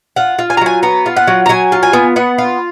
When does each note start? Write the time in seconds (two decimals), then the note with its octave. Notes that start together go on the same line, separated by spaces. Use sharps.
0.16 F4 F#5
0.39 F4
0.50 G#5
0.57 A#5
0.61 F#3 G#5
0.83 B3 A#5
1.06 F4
1.17 F#5
1.27 F#3
1.46 A#5
1.49 F#3 G#5
1.72 F4
1.83 G#5
1.93 B3
2.16 B3 F#5
2.38 F4